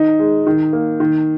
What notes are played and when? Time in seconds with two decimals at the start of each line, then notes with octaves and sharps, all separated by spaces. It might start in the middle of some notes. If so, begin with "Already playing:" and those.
Already playing: D#3 D#4
0.19 G#3
0.47 D#3
0.73 A#3
1.00 D#3